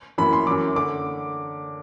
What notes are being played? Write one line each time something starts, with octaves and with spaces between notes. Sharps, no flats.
F#2 E3 B5
C6
F#2 E3 D6
D3 D6